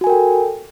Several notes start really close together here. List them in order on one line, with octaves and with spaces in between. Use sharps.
F#4 G#5 A#4 G5 A4